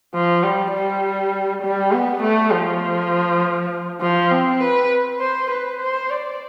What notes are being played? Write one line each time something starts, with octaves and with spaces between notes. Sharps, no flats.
F3
G3
G3
G3
B3
A3
F3
F3
C4
B4
C5
B4
C5
D5